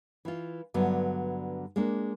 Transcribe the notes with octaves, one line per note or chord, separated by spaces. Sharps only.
E3 F4
G2 D3 F#3 A3 B3
G#3 A#3 D4